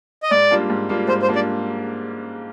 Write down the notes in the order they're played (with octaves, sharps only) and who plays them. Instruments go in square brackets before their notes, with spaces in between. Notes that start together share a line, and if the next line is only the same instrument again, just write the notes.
[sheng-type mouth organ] D#5
[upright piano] G#2 [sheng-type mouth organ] D5
[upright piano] G3 A#3 D4 F4
G#2
G3 A#3 D4 F4
[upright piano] G#2 [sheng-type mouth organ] C5
[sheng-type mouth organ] C5
[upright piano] G3 A#3 D4 F4
[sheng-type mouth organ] D5